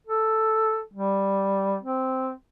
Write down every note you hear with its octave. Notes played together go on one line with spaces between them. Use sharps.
A4
G3
C4